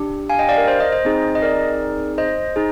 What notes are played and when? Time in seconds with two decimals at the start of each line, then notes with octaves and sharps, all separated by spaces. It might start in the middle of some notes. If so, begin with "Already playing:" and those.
Already playing: D4 G4
0.30 F5 G#5
0.39 D#5 G5
0.49 D5 F5
0.58 A#4
0.68 C5
0.80 C5 D#5
0.92 C5 D#5
1.05 C4 D#4 G#4
1.35 D#5
1.42 A#4 D5
2.18 C5 D#5
2.56 D#4 G#4